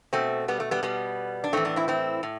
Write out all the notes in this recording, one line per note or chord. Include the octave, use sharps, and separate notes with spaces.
B2 A3 C4
G3 B3
A3
G3 B3
B2 G3 B3
D4
A2 E3 A3 C4
B3 D4
C4 E4
C4 E4
A2